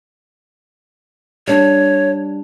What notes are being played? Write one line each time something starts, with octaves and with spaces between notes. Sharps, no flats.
G3 D4 C#5